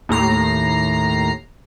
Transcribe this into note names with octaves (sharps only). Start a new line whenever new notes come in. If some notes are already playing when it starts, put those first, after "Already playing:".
D#2 A2 A#5 C7